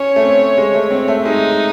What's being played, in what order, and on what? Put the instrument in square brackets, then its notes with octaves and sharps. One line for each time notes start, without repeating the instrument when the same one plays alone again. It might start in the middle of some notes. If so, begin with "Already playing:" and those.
Already playing: [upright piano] C#4 [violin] C#5
[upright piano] A3
C4
G#3
A3
C4
A3
[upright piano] G#3 [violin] D#4